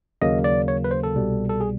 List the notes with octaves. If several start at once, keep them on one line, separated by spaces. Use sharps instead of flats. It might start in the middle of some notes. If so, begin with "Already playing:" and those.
D#2 C#3 F#3 A#3 D#5
D5
C#5
B4
C5
A4
C2 B2 G3
A4
G#4